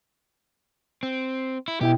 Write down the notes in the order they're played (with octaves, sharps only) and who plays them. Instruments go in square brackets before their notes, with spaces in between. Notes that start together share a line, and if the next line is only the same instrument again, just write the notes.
[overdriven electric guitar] C4
E4
[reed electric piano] B2 E4 G5 [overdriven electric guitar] G4